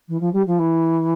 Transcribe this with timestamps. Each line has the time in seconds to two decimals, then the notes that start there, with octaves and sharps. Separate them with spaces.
0.08 E3
0.20 F3
0.33 G3
0.47 F3
0.59 E3